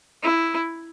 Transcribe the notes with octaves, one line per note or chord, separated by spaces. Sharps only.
E4